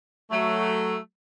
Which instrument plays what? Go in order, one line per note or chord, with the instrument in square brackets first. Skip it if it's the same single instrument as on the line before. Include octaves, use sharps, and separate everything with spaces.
[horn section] F#3 A3